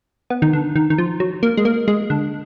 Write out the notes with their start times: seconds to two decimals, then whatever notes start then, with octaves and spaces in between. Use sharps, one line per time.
0.30 B3
0.42 D#3
0.53 D3
0.76 D#3
0.90 D#3
0.98 F3
1.20 F#3
1.43 A#3
1.57 G#3
1.65 A#3
1.88 G#3
2.10 D3